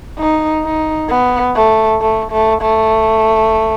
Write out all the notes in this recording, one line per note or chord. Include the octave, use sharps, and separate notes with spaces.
D#4
D#4
B3
A3
A3
A3
A3